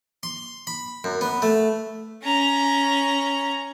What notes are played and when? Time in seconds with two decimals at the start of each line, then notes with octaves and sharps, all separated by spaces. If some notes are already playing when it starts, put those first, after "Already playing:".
0.23 C6
0.67 B5
1.04 F#2
1.21 B3
1.42 A3
2.23 C#4 A#5